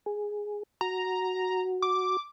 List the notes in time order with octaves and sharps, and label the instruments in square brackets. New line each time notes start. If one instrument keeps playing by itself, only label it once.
[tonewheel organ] G#4
[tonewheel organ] F#4 [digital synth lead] A#5
[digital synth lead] D6